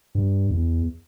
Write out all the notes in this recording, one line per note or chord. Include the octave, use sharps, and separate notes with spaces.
G2
E2